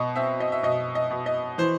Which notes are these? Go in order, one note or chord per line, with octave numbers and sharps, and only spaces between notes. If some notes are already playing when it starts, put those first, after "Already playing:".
Already playing: B2 D#5
C4 E5
D#5
E5
B2 D#5
D#5
B2
D#5
E3 C5